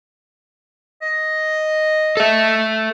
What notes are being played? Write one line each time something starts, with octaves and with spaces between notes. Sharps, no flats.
D#5
A4 E5